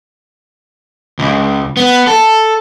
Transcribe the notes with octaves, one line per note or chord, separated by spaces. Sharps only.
C#2
B3
A4